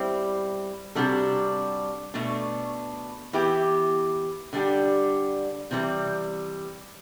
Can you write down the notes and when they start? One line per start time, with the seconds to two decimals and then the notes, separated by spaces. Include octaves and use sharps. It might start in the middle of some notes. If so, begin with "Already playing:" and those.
Already playing: G3 C4 E4
0.95 C3 G3 D4 F#4 A4
2.14 B2 A3 D4
3.33 E3 B3 E4 G4
4.53 D3 G3 D4 G4
5.71 C3 E3 G3